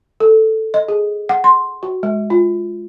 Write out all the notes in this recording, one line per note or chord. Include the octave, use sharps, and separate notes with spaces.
A4
D#5
G#4
F#5
C6
F#4
G#3
F4